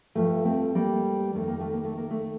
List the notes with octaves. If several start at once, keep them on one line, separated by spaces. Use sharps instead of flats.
G2 F3 A3
A3 C4
G3 A#3
F2 D#3 A3
A#3
A3
A#3
A3
A#3
A3